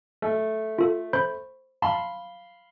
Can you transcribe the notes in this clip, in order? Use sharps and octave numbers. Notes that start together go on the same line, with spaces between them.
A3
F4 A4
C5 B5 G6
F5 A5 B5 C6